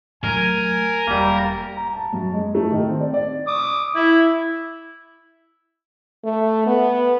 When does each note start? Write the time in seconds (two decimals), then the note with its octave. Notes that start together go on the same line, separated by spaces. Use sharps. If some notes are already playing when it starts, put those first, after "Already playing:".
0.24 F#3 A3 A#4 G#5
1.07 E1 G3 A#3
1.77 A#5
1.93 A5
2.13 F#2
2.33 G#3
2.55 A3
2.71 D#3
2.88 C4
3.00 D5
3.14 D5
3.47 D6 D#6
3.95 E4
6.24 A3
6.67 B3